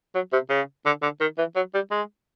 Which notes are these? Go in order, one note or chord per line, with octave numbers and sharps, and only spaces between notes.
F#3
C3
C#3
D3
D3
D#3
E3
F#3
G3
G#3